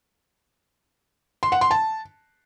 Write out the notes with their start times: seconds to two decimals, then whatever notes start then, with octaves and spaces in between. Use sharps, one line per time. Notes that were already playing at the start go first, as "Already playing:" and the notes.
1.43 C6
1.52 F#5
1.61 C6
1.71 A5